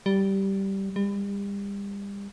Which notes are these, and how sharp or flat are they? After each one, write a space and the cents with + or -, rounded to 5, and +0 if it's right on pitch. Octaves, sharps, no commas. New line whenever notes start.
G3 -10
G3 +35